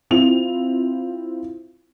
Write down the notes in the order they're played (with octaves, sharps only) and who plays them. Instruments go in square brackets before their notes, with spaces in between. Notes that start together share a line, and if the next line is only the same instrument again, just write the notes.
[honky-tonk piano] C4 E4 F4 F7